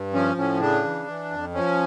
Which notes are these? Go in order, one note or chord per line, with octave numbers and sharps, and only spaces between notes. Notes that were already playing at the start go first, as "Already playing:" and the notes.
Already playing: G2
F3 C#4
A2 C#4
C#3 D4
E3
E3
F2
F3 C#4